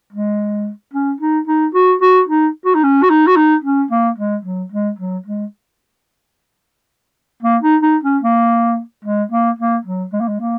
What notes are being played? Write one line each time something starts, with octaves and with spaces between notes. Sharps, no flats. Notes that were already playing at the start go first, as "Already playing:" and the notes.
G#3
C#4
D#4
D#4
F#4
F#4
D#4
F#4
D#4
C#4
F#4
D#4
F#4
D#4
C#4
A#3
G#3
F#3
G#3
F#3
G#3
A#3
D#4
D#4
C#4
A#3
G#3
A#3
A#3
F#3
G#3
A#3
G#3
A#3